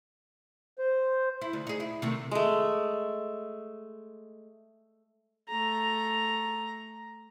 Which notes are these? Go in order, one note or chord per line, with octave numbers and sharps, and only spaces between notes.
C5
E4
D2
D#4 G#4
E4
C3 D#3 A3
G#3 A3
A3 A#5